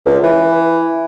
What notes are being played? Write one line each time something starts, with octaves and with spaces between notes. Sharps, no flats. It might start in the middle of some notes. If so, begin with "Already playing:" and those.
C#2
E3